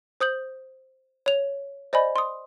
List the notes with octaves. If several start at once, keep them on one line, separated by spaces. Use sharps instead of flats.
C5 D#6 G6 F#7
C#5 F7
C5 D5 D#5 G#5 B5
C6 D#6